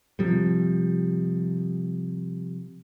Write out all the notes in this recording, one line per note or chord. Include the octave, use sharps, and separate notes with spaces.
C3 F3 G3